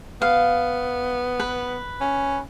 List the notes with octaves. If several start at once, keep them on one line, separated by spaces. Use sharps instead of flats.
B3 F5
B4
C#4